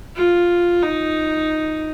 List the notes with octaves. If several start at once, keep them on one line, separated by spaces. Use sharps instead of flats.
F4
D#4